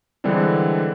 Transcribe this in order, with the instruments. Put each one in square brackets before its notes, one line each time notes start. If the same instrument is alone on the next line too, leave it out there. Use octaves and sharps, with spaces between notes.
[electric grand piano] D3 E3 G3 G#3 C4 D4